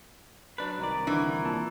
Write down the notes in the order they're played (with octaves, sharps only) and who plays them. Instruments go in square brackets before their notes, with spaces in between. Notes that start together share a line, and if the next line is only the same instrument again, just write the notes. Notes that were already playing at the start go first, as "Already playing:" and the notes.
[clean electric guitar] F#3 D4 B4
[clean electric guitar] C2 D#3 D5 [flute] A#5
[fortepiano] D3 [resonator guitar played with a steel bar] E3 [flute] A#5
[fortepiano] A#2 A5